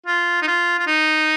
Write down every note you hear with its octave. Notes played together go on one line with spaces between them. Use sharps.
F4
D#4
F4
F4
D#4